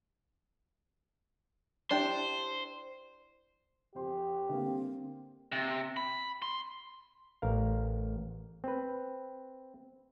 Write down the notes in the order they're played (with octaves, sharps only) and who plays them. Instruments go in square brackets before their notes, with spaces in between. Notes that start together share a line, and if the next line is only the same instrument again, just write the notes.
[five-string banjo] D4 E4 G4 [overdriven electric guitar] C5
[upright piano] F2 C5 C6 [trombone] G4
[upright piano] D3 G3 A#3 [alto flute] C4
[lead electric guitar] C3
B5
C6
[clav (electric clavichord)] A1 A#4 F5
C4 B4